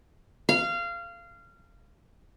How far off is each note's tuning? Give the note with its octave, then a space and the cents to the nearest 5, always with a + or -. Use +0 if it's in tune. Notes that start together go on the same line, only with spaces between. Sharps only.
F5 -20